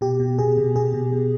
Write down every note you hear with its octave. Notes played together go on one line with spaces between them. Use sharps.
B2 G4
B2
B2 G#4
B2
B2 G#4
B2
B2